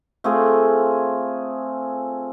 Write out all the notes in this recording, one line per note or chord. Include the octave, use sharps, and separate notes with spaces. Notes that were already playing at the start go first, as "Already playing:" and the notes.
A3 C4 F4 G#4